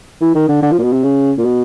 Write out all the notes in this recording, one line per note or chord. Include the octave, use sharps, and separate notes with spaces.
E3
D#3
D3
D3
F3
A#2
B2
C3
C#3
A#2
B2